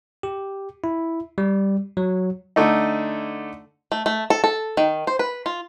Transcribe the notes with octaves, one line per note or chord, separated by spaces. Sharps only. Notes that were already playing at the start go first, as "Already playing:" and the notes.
G4
E4
G3
F#3
D3 A3 D#4
A3
A3
A4
A4
D#3
C5
B4
F4